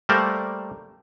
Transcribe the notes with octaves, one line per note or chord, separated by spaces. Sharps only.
G3 A3 A#3 A#4 C5 D5